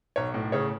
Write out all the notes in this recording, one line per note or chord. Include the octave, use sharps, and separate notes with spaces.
B1 C#5
A2
C#3 C#5